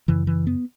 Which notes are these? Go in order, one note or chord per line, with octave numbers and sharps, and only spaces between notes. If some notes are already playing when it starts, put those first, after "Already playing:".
F#2 C#3 E3
E3
B3